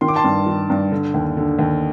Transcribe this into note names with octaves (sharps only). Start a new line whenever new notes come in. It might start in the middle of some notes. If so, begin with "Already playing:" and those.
D#3 C6
D6
A5 C6
G2
D#3
G2
D3
D#2
D3
D#2